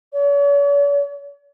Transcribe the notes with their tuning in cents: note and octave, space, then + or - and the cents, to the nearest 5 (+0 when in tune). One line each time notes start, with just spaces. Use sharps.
C#5 +45